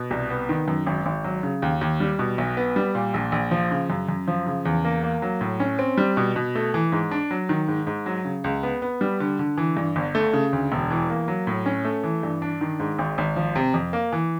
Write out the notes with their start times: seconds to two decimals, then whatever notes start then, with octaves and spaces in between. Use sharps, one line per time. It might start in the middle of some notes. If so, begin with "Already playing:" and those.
Already playing: B2
0.11 C2
0.30 B3
0.49 D#3
0.68 F#2
0.86 G#1
1.06 G#1
1.24 F#3
1.43 C#3
1.62 D#2
1.81 D#2
2.00 G3
2.19 B2
2.38 B1
2.57 B3
2.76 G3
2.95 A#2
3.14 A#1
3.32 A#1
3.51 F3
3.71 C#3
3.90 F#2
4.09 F#2
4.28 F3
4.46 C#3
4.65 E2
4.85 A#3
5.03 A#3
5.22 F#3
5.41 A2
5.60 C#4
5.79 C4
5.98 G3
6.17 B2
6.36 B2
6.55 A3
6.74 E3
6.92 G#2
7.11 D4
7.31 F#3
7.49 D#3
7.68 G#2
7.87 G#2
8.06 F#3
8.25 C#3
8.44 C#2
8.63 B3
8.82 B3
9.01 G3
9.20 D3
9.39 D3
9.58 E3
9.77 G2
9.96 G1
10.15 A3
10.33 C#3
10.53 D2
10.72 E1
10.91 E3
11.10 A#3
11.28 F#3
11.47 A2
11.66 C#4
11.85 A3
12.04 E3
12.23 G2
12.42 D4
12.61 D#3
12.80 G#2
12.99 G#1
13.18 G#1
13.36 F3
13.56 C3
13.74 F2
13.93 A#3
14.13 E3